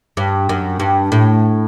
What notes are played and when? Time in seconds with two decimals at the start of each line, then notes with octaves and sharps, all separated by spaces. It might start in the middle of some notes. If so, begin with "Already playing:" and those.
0.17 G2
0.49 F#2
0.80 G2
1.12 A2